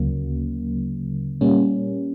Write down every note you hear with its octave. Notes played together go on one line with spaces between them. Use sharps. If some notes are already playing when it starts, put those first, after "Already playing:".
Already playing: D2 C#3 F#3 A#3
A#2 G3 A#3 C#4